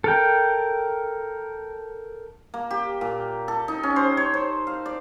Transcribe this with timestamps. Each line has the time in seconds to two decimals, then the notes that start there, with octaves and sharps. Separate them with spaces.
0.04 A4 A#4 G5
2.54 A#3
2.71 G4
3.01 A#2
3.48 A4
3.68 D#4
3.83 C#4
3.96 C5
4.17 C#5
4.34 C5
4.67 F5
4.86 D5